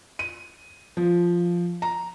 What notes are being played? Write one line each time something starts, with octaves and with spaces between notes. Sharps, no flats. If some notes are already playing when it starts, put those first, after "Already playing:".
D#7
F3
A#5